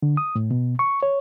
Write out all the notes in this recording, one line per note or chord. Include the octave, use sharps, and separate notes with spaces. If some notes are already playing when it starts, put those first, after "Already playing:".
D3
D#6
A2
B2
C#6
C#5